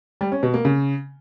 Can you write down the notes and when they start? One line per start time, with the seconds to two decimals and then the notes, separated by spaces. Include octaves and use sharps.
0.21 G3
0.32 C#4
0.43 B2
0.54 A#3
0.65 C#3